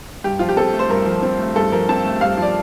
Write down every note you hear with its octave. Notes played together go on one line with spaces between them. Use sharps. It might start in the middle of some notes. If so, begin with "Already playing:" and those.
G2 G4
F3 F4
G4
C4 A4
A3
C5
G2 A#4
F3
C4
A3
G2 A4
F3 A#4
C4 A5
A3
G2 F5
F3 D5